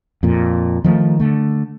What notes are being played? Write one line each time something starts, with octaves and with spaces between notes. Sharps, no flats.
F2 A#2
D#3 F3 G#3 A3
D3 A3